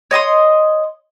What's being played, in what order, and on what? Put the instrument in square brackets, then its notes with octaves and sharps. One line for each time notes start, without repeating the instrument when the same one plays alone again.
[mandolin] C#5 D#5 C6 D#6